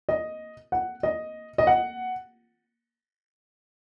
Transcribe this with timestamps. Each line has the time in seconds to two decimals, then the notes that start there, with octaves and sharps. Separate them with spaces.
0.09 D#5
0.72 F#5
1.03 D#5
1.58 D#5
1.67 F#5